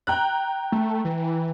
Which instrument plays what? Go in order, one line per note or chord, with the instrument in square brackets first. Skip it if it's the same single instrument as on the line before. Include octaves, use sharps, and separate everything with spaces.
[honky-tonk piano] G5 A#5 F#6
[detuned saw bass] A3
E3